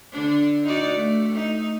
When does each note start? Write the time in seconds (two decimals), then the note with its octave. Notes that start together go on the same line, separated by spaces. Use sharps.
0.12 D3 D4
0.64 D#4 F#4 D5
0.94 A3
1.32 A3 D#4